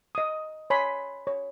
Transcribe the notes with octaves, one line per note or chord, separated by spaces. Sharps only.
D#5 D#6
C#5 G#5 B5 C6
C#5